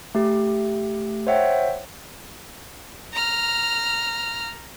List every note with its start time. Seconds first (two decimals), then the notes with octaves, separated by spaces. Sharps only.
0.15 A3 G4
1.27 C5 C#5 E5 F#5 G5
3.13 A#5 F6